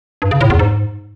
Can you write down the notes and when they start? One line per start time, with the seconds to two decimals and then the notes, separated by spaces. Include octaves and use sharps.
0.22 G2
0.31 C#3
0.41 A2
0.50 E2
0.59 G#2